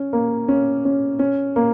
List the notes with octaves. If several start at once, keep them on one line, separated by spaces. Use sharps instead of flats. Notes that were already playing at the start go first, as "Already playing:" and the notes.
Already playing: C#4
A#3
C#4
C#4
C#4
A#3